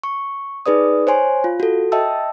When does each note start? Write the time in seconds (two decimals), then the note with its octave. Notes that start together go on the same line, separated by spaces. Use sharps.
0.03 C#6
0.66 D#4 G#4 B4 D5 D#6
1.07 C5 C#5 G#5 C6
1.44 F4
1.60 F#4 A4
1.92 D#5 E5 G5 A5 E6